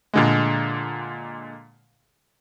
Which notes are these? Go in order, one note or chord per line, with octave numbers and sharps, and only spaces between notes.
A#2 D3 G#3